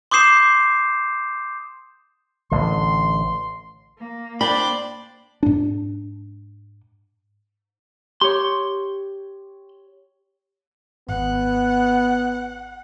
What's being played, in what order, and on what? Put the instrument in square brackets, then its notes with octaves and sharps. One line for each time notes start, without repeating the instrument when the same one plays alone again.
[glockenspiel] C6 D6 D#6 G6 C7 E7
[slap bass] A1 D3 [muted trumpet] C6
[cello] A#3
[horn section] D4 C5 D5 [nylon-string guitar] G5 [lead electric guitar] B5
[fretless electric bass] G#2 D4
[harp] G4 C#5 [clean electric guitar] C6
[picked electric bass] G#1 [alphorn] B3 [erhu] F#5